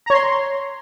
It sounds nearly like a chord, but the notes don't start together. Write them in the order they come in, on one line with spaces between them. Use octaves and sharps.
A#5 C#5 C6